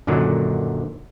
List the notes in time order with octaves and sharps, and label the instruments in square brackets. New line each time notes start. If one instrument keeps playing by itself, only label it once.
[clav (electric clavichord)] F#2 A#2 D3 D#3 F#3